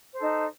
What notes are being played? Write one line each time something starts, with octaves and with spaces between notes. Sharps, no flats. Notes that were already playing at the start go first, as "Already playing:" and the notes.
D#4 A4 C5